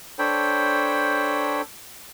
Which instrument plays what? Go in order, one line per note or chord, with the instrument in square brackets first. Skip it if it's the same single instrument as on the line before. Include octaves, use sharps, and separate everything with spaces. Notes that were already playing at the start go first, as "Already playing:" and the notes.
[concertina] D4 A4 C5 C#5 G5 B5